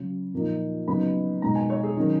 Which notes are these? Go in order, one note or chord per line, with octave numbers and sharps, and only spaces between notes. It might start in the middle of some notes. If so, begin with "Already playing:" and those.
Already playing: C#3 F#3 C#4
A#2 F3 A#3 D#4
C#3 F#3 B3 D#4 B5
B2 G#3 D#4 A#5
G#5
C#5
G#4
D#3 F#3 C#4